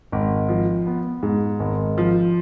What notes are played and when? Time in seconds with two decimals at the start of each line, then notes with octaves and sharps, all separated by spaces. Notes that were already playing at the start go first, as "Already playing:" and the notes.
0.12 G#1
0.49 F3
0.87 B3
1.23 G#2
1.60 G#1
1.98 F3